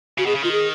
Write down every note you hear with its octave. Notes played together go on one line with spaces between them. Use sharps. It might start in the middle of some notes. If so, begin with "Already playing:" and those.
C#3 F#4
B2 G#4
C#3
D#3 F4
G#4